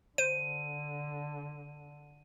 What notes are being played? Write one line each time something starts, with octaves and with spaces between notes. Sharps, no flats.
D3 C5 D#7